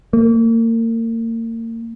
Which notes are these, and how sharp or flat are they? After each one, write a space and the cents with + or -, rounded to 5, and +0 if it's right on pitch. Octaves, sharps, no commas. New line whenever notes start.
A#3 -35